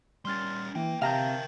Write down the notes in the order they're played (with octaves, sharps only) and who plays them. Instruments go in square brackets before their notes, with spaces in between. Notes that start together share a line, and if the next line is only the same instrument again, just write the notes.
[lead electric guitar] G3 C#4 [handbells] C6 F6 A6
[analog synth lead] E3 [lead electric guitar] A#3 [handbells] G5
[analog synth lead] C3 [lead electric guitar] A#4 G5 [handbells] E5 A5 G6 [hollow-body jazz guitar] F5 A#5